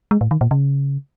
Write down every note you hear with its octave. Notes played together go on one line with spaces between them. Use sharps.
G#3
A2
D#3
A#2
C#3